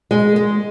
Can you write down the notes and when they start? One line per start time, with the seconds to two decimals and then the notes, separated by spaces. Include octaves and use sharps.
0.11 G#3
0.36 G#3